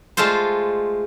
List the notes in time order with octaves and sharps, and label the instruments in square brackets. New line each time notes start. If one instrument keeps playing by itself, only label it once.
[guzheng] G#3 A3 F4 A4 C5